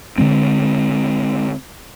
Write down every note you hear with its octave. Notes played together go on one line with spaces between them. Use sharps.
D3 D#3 G#3 C4